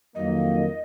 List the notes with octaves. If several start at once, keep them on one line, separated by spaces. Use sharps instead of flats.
F2 D#3 F#3 A#3 D#5